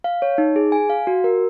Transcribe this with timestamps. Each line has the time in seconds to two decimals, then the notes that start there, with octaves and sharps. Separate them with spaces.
0.04 F5
0.22 C#5
0.38 D#4
0.56 G#4
0.72 G#5
0.90 F5
1.07 F#4
1.24 A#4